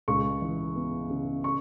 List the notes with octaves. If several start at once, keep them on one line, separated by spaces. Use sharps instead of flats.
C#2 C#6
E3
B3
C#3
C#6